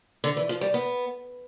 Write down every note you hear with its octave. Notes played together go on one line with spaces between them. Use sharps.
D3
E3
F3
G3
B3